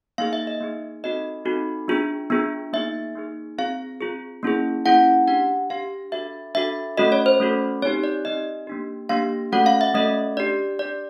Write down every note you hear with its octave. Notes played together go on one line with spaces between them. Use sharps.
A#3 D#4 G#4 F5
E5
D#5
A#3 D#4 G#4
C4 D#4 F#4 A4 D#5
C4 D#4 F#4 A4
B3 D4 F4 G#4
B3 D4 F4 G#4
A#3 D#4 G#4 E5
A#3 D#4 G#4
C4 F4 G#4 F5
C4 F4 G#4
A#3 C#4 E4 G#4
A#3 C#4 E4 G#4 F#5
D4 G4 F#5
D4 G4 F5
D4 F#4 A4 E5
D4 F#4 A4 E5
A3 C#4 F#4 A4 D#5
C#5
C5
A3 C#4 F#4 A4
C4 D#4 G4 C#5
D5
C4 D#4 G4 D#5
A#3 D4 G4
A#3 D4 G4 F5
A3 C#4 F#4 A4 F#5
F5
E5
A3 C#4 F#4 A4 D#5
D4 G4 D5
D4 G4 D5